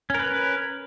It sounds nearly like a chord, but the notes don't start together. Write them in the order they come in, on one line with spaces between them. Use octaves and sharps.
C#4 A#4 B4